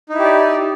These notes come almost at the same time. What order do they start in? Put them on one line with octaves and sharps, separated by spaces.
D#4 E4 G4 D5